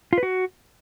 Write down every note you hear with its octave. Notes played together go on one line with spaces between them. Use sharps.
F4
B4
F#4